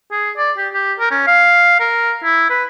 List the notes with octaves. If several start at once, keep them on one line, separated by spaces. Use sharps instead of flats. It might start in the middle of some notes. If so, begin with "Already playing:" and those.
G#4
D5
G4
G4
A#4
C#4
F5
A#4
E4
B4